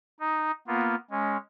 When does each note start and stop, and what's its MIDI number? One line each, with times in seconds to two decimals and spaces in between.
0.20 0.51 63
0.68 0.95 58
0.68 0.95 59
0.68 0.95 65
1.11 1.37 56
1.11 1.37 61